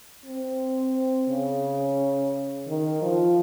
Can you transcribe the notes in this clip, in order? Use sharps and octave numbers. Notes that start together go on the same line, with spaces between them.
C4
C#3
D#3
F3